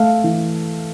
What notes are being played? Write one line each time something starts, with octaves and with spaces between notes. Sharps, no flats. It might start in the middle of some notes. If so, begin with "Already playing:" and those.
Already playing: A3 F5
E3